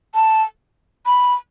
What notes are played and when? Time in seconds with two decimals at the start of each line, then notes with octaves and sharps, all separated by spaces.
0.15 A5
1.06 B5